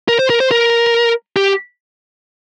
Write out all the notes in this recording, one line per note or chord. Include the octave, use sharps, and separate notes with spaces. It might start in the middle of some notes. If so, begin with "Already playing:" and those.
A#4
C5
A#4
C5
A#4
G4